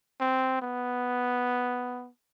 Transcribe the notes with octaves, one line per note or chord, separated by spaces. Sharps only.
C4
B3